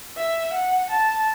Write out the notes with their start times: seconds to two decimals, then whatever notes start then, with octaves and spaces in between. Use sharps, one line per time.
0.17 E5
0.53 F#5
0.90 A5